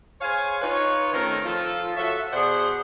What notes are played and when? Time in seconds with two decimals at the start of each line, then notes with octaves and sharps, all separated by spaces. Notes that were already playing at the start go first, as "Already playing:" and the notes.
0.21 G#4 C5 C#5 F5 G#5
0.62 D#4 F4 B4 C#5
1.14 D#3 A3 C4 C#4 A4 A#4
1.45 F3 F4 A4
1.97 F#4 A4 C#5 E5
2.32 B2 G#4 C5 D5 F#5 C6